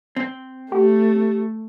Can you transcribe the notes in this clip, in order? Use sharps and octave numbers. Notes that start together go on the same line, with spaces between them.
C4
A3 G4